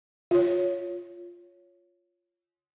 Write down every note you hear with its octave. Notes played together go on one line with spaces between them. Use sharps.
F4 C#5